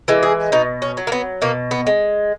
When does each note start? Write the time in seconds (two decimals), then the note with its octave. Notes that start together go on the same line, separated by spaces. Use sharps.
0.08 E3 G#3
0.23 G#4
0.52 B2 D#4
0.82 C#4
0.97 F#3
1.07 A#3
1.12 B3
1.42 B2 A#3
1.71 B3
1.87 G#3